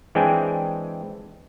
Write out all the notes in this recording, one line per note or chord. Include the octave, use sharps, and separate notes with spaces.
E3 G#3 C4 D4 G5 G#5